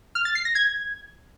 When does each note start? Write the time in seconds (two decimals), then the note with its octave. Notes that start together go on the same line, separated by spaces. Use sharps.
0.15 F6
0.25 A6
0.35 C7
0.45 A#6
0.55 G#6